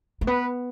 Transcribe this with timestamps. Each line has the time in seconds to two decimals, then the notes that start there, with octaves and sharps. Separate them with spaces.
0.21 A3
0.27 B3 B4